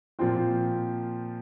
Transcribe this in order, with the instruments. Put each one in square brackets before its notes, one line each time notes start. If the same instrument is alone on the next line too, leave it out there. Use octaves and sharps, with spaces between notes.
[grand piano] A#2 F3 C4 F4